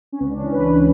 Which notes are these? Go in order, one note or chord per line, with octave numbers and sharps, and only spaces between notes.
C#4
C#2 B3
D4
C#4
E3
B4
C#2
B4